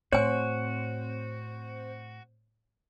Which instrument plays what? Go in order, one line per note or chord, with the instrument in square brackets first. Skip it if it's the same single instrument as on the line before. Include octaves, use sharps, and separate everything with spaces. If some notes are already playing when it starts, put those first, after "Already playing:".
[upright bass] A2 [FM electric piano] C4 C5 [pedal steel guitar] F#4 [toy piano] C#5 G#5